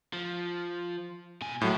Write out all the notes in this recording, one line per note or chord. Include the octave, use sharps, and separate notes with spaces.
F3
B2 G#5
A2 F#3 G#3 A4